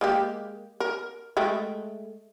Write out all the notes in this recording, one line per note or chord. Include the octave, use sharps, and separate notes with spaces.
G#3 A#3 G4
A#4
G#3 A3 G5